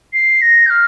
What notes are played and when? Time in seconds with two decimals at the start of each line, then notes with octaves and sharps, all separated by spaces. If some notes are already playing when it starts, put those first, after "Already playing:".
0.13 C7
0.41 A#6
0.66 G6
0.70 F6